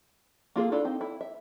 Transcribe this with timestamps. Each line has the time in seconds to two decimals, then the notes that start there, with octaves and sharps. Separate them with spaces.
0.56 A#3 F4 G#4 A4
0.72 D4 E4 F4 A4
0.85 C4 D#4
1.01 E4
1.21 E5